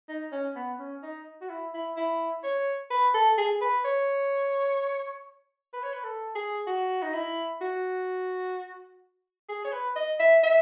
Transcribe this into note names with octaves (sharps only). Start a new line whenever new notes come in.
D#4
C#4
B3
C#4
D#4
F#4
E4
E4
E4
C#5
B4
A4
G#4
B4
C#5
B4
C#5
B4
A4
G#4
F#4
D#4
E4
F#4
G#4
C#5
B4
D#5
E5
E5